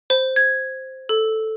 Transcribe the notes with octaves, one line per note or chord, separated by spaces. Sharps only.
C5
G#6
A4